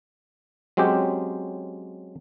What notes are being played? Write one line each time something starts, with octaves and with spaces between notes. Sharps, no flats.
F#3 G#3 C4 C#4 G4